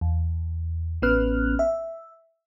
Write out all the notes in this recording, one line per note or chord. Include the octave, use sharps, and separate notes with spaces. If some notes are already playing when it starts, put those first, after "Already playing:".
E2
A1 B3 C#4 B4 F6 F#6
E5